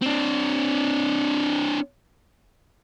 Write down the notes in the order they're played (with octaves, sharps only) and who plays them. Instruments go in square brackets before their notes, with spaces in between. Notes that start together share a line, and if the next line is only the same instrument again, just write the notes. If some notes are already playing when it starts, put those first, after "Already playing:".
[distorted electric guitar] C4 D4